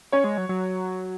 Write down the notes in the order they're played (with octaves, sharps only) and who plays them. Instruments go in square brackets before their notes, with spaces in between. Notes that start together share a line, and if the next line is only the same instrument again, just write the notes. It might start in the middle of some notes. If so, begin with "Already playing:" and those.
[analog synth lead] C#4 [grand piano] C#5
[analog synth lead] G#3
F#3
F#3